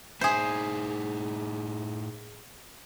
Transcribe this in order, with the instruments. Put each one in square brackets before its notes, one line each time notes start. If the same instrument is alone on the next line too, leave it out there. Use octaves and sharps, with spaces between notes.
[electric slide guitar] A2 D#4 E5 [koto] G#4 C5